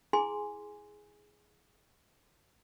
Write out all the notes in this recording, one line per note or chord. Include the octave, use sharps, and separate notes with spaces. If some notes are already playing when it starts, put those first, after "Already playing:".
E4 G#4 G#5 C6 D6